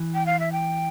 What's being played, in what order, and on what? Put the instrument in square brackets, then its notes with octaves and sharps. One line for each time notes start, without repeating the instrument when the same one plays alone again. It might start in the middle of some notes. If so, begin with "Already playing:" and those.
Already playing: [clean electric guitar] E3
[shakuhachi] G5
F5
E5
G5